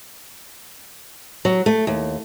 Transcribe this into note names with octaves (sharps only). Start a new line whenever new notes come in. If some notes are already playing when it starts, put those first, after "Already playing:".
F#3
A3
D#2